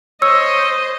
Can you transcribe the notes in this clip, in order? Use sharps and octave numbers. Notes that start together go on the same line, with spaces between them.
C5 C#5 D#5 E6